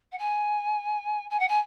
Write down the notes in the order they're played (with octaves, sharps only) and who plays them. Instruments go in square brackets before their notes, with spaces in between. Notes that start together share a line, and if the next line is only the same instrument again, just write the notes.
[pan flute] F#5
G#5
G#5
F#5
G#5